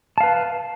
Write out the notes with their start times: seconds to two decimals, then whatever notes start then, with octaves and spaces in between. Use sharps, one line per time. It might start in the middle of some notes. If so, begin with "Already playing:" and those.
0.18 A5
0.20 F5
0.23 B4